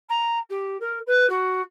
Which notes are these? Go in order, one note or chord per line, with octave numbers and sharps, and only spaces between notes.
A#5
G4
A#4
B4
F#4